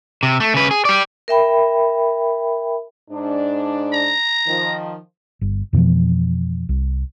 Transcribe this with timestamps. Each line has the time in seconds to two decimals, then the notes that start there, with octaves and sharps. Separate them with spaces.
0.23 C3
0.40 A3
0.54 C#3 B4
0.71 G#4
0.85 G4 D5
1.28 A#4 E5 G5 B5
3.11 G#2 D4
3.94 A#5
4.47 D#3 F3
5.41 G1
5.73 F2 B2 E3 F3
6.69 C2